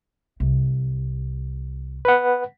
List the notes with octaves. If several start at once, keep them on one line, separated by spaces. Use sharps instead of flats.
C2
B4 F#5